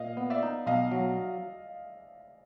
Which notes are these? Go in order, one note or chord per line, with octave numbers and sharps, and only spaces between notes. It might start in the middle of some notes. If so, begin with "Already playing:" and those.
Already playing: A#2 D#5 F5
B3
D5 E5
D#4
B1 D#5 F5
F#3